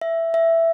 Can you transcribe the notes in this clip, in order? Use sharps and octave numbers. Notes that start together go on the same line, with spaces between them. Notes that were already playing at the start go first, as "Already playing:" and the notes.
E5
E5